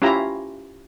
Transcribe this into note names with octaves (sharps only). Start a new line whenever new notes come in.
C#4 E4 F4 G4 A#5